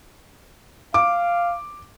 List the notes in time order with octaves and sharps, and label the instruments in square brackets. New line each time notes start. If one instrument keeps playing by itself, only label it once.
[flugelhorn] F5 [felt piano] D6